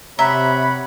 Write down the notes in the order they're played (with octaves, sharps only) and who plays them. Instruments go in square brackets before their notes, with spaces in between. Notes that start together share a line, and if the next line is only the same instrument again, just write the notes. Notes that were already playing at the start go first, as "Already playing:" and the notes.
[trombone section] C3 [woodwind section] C#5 F#5 B5 [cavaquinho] E5 [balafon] A#5